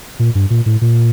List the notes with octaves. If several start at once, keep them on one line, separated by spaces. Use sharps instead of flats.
A#2
G2
A#2
A2
A#2